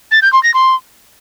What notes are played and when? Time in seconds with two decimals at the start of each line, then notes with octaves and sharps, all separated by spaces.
0.11 A6
0.22 G6
0.33 C6
0.43 A#6
0.54 C6